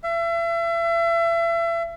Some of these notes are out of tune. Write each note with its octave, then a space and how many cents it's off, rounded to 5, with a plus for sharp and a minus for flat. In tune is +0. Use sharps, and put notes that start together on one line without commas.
E5 +35